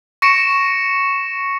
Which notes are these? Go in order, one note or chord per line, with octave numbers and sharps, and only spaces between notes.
C#6 A#6 C#7 D7 E7